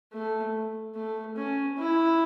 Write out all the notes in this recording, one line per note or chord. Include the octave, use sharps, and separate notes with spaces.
A3
A3
C#4
E4